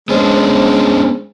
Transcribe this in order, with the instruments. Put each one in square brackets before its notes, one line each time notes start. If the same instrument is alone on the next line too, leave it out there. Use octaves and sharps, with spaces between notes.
[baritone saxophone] G#3 [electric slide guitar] B3 C#4 D4 [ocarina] C5